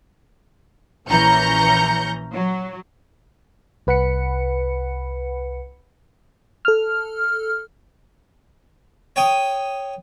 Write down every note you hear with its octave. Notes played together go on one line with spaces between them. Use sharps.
A#1 E3 C#4 A#5 G6 C#7
F#3
C2 B4 F#5 B5 C#7
A4 F6
C#5 G5 D#6